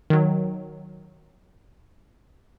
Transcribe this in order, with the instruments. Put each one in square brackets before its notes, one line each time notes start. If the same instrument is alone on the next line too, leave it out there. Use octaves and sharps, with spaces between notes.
[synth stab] D#3 F#3